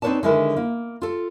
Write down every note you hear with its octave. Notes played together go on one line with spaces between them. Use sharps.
C4 D#4 B4 C#5 D5 A5
D3 D#3 G#3 E4 A#4 B4
A#3
F4 A4